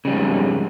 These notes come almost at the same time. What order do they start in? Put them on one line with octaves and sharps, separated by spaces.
C#3 G3 F2 G#2